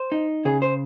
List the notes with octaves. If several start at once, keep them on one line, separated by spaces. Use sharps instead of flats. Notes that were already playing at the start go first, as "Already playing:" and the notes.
Already playing: C5
D#4
C#3 G#4
C5